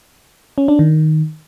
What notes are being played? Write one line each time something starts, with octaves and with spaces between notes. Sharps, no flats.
C#4
D4
D#3